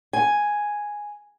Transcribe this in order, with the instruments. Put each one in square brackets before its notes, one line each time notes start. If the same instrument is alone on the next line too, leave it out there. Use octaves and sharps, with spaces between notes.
[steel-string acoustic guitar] G#5